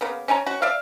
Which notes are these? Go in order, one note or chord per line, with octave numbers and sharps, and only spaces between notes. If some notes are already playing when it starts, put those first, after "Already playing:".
C#3 A#3 B3
C#4 C#5 G#5 A#5
C#4 F#4
D5 E5 F5